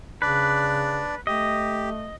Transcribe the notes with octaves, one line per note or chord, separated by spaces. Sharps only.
C#3 D4 B4 D5
A3 G4 D#5